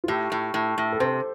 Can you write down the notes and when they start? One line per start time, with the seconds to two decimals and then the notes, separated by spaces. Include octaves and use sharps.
0.04 F4
0.08 A2 G4
0.32 A2
0.54 A2
0.78 A2
0.92 A4
1.00 C3 C5